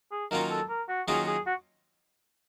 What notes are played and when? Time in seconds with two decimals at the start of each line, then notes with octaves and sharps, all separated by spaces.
0.12 G#4
0.31 D#3 F#3 A#3 C#4 F4 A#4
0.50 A4
0.69 A#4
0.89 F#4
1.08 D#3 F#3 A#3 C#4 F4 G#4
1.27 G#4
1.46 F#4